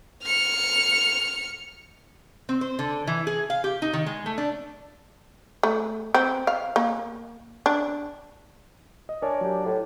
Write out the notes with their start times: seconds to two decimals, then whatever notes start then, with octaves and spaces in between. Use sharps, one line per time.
0.23 F6 C#7
2.49 C4
2.61 C5
2.79 D3
3.07 E3
3.27 G#4
3.50 F5
3.64 G4
3.82 D#4
3.93 D#3
4.06 G#3
4.26 A3
4.38 D4
5.63 A3
6.14 C4
6.47 F5
6.76 A#3
7.66 D4
9.09 D#5
9.22 D4 A#4 C#5 G#5
9.41 F#3 G4
9.66 A2